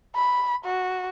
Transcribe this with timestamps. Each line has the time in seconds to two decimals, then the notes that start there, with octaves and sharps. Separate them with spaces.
0.15 B5
0.65 F#4